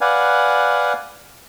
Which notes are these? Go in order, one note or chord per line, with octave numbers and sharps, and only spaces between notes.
B4 D5 F5 F#5 G#5